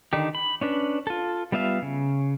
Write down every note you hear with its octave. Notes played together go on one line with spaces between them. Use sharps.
D3 D#3 D#4 G4
B5
C#4 D4 B4
F4 A4
G3 B3 F4 E5 F5
C#3